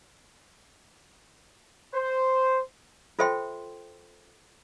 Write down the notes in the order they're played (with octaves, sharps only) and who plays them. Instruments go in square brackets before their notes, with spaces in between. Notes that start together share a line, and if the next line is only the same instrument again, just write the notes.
[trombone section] C5
[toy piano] F4 A4 C5 E5 G5 C6